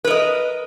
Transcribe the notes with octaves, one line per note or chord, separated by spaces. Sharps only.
A#4 B4 D#5